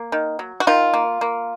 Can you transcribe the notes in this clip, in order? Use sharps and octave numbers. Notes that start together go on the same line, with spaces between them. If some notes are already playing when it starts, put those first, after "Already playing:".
Already playing: A#3
D#3
F#3
F#4
D#3 F4
A#3
A#3